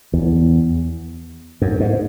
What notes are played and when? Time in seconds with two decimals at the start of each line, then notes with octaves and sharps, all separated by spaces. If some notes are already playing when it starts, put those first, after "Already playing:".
0.13 E2
1.62 F#2
1.80 G#2